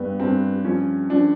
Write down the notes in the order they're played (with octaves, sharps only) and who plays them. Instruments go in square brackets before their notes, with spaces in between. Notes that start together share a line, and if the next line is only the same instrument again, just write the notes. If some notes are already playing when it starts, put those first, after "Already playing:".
Already playing: [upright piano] G2 B3
G2 C4
F3 C#4
F3 D4